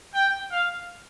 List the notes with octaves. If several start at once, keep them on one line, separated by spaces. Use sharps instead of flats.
G5
F5